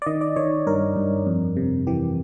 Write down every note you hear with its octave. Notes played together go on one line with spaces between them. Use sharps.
D5
D#3 D#5
D5
D#3 C#5
G2 A#4
G2
F2
C3
E3 G4